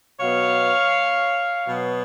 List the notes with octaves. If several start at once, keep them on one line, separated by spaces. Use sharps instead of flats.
B2 F#3 B3 C#5 F5
B2 F#3 B3